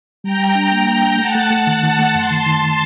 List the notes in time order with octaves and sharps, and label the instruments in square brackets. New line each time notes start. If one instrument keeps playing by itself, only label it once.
[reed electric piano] G3 [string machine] G5 A#5
[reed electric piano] G3
D4
A#3
A#3
D4
[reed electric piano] A3 [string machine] F#5 A5
[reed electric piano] A3
A3
[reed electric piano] D#3 [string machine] F#5 A5
[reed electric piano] D#3
A3
[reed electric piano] F#2 [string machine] A5 C6
[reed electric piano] D#3
D#3
D#3